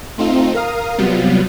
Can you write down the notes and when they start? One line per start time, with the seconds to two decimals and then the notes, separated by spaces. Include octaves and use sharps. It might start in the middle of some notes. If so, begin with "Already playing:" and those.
0.18 A3 C4 D#4 F4
0.54 A#4 F5 D#6
0.98 C3 F#3 G3 B3 F4